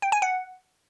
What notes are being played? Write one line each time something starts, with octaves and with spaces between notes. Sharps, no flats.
G5
G#5
F#5